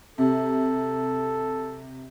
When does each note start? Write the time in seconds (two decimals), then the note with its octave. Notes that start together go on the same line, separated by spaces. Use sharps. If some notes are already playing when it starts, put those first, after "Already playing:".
0.18 C3 A4